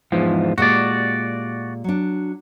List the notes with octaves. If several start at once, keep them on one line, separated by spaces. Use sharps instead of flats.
E2 G#2 F3
A#2 G#3 F#4 G4 D5
F#3 D4